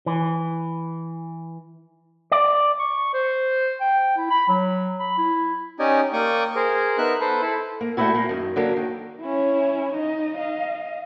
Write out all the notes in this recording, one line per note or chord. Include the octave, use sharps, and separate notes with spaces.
E3
D5
C#6
C5
G5
E4
B5
F#3
B5
E4
C#4 D#4 G4 D5 D#5 G#5
A#3 D5 G5 C#6 D#6
G#4 A#4 C5
B3 D#4 A#4 E5 F#6
A4 B4 C5
E4 A4
A#3
G3 A3 B3 D#4 E4 F#4
A#2 A#3
F#2 D#3
D3 F#3 A#3
D#3
C#4 E4
D#4 D#5
D#5 F5